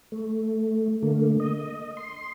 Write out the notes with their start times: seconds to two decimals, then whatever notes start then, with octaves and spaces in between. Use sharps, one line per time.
0.12 A3
1.03 D3 A3 A#3
1.40 D#5
1.97 C6